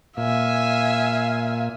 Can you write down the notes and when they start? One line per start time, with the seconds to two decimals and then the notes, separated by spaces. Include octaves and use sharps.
0.17 A#2 E5 F5 G#5